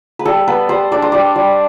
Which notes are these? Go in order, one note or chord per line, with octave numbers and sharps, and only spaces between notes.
B4
G3 A4
B3 B4
G3 C5
D4 D5
C5
G3 D5
G3